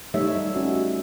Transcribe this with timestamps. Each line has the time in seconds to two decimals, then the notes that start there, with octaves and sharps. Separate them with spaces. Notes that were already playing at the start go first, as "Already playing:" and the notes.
0.14 G3 A3 D#4 A4 C#5 E5
0.55 C#4 F#4